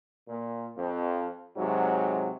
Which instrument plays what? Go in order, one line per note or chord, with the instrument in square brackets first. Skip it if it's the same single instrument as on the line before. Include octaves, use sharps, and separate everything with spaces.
[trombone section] A#2
F2
G#2 C3 F#3